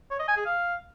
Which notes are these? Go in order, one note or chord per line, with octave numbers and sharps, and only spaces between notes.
C#5
D#5
G#5
G#4
F5